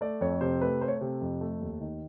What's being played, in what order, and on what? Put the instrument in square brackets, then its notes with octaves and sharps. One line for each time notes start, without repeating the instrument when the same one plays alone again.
[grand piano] A3 D5
F2 C#5
C3 C5
A3 B4
A3 C5
C#5
C5
C3
F2
A3
D#2
D#3